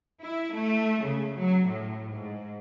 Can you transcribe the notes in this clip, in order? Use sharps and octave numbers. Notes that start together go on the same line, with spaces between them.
E4
A3
C#3
F#3
A2
G#2